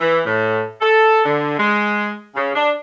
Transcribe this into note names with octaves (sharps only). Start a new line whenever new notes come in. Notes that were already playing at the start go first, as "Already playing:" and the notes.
E3
A2
A4
D3
G#3
C#3
D4